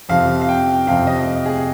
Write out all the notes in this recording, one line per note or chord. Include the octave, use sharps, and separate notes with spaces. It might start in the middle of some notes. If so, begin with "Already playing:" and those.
F2 C3 F3 F5
F5
G5
F2 C3 F3 F5
D#5
G#4